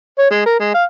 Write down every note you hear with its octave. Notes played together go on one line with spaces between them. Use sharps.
C#5
G#3
A#4
G#3
F5